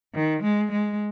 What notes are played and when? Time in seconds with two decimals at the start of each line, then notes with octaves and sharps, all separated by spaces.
0.14 D#3
0.43 G#3
0.72 G#3